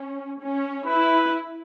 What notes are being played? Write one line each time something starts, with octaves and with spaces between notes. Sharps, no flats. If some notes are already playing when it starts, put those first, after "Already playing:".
Already playing: C#4
C#4
E4 B4